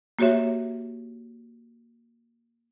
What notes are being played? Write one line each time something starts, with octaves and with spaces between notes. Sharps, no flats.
A#3 F#4 G4 C#5 E5